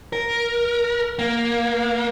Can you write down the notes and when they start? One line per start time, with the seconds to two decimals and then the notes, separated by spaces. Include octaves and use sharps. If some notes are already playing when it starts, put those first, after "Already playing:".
0.13 A#4
1.19 A#3